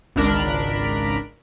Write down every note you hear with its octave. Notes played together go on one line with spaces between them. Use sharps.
G#1 C#2 D4 A#4 B5 D7